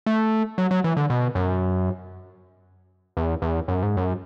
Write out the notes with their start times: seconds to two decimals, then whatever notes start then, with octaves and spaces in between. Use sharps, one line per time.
0.06 A3
0.58 F#3
0.71 F#3
0.84 E3
0.97 D3
1.10 B2
1.35 F#2
3.17 E2
3.42 E2
3.68 F#2
3.83 G#2
3.97 F#2